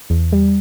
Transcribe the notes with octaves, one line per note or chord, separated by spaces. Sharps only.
E2
G3